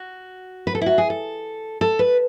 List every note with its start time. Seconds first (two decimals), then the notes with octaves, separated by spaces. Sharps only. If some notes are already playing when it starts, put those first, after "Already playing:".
Already playing: F#4
0.67 B4
0.75 A4
0.81 E4
0.86 F#4
0.98 G#4
1.10 A4
1.81 A4
1.99 B4